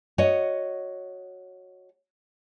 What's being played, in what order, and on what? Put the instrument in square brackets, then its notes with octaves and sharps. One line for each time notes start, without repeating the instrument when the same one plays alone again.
[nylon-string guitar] F#4 C#5 D#5